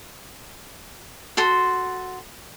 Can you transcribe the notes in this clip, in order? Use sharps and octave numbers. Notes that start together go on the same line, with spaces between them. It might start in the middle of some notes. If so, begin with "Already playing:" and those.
F#4 A4 C6